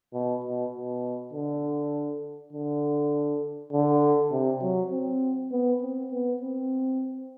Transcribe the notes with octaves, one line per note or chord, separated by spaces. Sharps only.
B2
B2
B2
D3
D3
D3
C3
F#3
C4
B3
C4
B3
C4